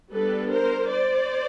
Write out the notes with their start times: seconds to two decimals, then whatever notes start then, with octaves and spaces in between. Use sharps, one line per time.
0.13 G3 B3 D4 A4 B4
0.52 A#4 C5
0.90 C5 D5